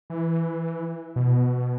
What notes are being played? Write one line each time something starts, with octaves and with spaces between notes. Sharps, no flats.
E3
B2